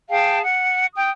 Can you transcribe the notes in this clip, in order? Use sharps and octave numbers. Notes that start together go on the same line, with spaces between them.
G#4 F5 G5 A5
F#5
G5 D#6